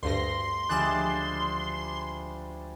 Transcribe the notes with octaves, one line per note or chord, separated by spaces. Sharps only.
D2 G2 C6 A#6
D2 F3 G3 G#3 D5 F#6 E7